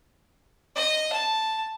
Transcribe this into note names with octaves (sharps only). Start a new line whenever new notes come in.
D#5
A5